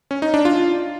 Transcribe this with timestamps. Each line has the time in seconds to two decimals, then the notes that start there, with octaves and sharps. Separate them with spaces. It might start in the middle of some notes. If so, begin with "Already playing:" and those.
0.11 C#4
0.22 D#4
0.34 D4
0.45 F4